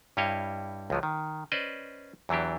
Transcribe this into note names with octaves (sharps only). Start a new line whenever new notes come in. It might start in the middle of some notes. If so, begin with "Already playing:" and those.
G2 G3 E4 C#5 D#5 F5
C#2 F3 F#3
D#3
C#4 B4 C5 D5 D#5
E2 E3 F#3 D4 G4